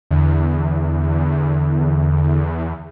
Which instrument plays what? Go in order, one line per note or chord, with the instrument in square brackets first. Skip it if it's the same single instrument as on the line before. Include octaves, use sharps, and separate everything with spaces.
[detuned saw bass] E2 [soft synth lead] D3